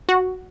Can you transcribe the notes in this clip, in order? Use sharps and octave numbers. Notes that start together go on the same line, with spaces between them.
F#4